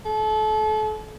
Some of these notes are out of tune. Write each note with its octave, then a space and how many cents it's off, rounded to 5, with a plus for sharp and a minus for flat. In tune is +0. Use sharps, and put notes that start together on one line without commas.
A4 -35